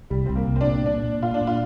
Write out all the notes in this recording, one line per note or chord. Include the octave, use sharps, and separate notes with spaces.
C2 G3
C2 C4
A#3
C2
C4
D4
A#2
A#2 D4
A#2
A#2 F4
D4
A#2
F4